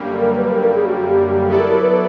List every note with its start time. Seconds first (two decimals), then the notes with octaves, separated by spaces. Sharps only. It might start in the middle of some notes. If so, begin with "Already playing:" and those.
Already playing: F#2 D3 G3 A#3
0.20 A#4
0.35 B4
0.49 A#4
0.63 A#4
0.75 G#4
0.85 F#4
1.06 G4
1.49 F#3 B3 E4 G4 A4 D5
1.59 A#4
1.70 A#4
1.81 B4